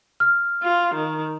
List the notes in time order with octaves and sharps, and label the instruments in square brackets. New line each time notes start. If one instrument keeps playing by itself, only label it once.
[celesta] F6
[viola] F4
D#3